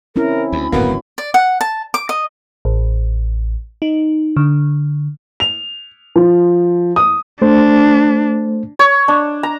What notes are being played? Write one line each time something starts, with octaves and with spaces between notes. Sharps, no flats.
C4 C#4 E4 A#4
D2 B5
D1 G#1 F#2 A#3 B3 F#4
D5
F#5
A5
D6
D#5
A1
D#4
D3
F7
F3
D#6
A3 D4 C5
C#5
D4
A#5